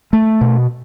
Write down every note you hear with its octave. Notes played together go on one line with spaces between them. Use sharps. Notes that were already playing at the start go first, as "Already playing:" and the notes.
A3
B2